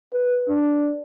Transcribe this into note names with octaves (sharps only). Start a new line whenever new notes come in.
B4
D4